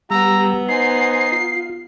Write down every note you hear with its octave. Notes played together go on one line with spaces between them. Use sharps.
G3 B3 G4 A#5 E6
D#4 C5 G#5 C7
F4